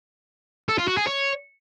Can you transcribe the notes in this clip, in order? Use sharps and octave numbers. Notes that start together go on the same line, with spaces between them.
A4
F4
F#4
G#4
C#5